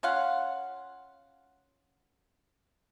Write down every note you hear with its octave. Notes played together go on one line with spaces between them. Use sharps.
C#4 F4 F5 F#5